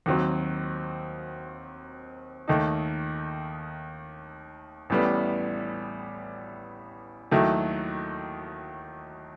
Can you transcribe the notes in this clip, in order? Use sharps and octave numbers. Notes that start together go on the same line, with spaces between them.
D#2 D#3 F#3 C4
D#2 D#3 A3 D#4
A1 A2 G3 B3
D#2 D#3 F#3 A3 E4